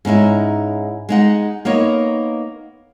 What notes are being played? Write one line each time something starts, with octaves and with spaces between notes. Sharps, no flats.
G#2 C#4 D#4 E4
G#3 D#4 F#5
A#3 B3 D#4 C#5